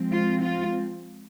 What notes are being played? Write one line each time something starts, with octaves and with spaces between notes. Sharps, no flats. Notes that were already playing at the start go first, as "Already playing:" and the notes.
Already playing: F3 G#3 C4
F4
F4